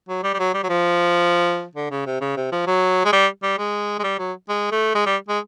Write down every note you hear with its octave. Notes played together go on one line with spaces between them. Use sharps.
F#3
G3
G3
F#3
G3
F#3
F3
D3
C#3
C3
C#3
C3
F3
F#3
G#3
G3
G3
G#3
G#3
G3
F#3
G#3
A3
G#3
G3
G#3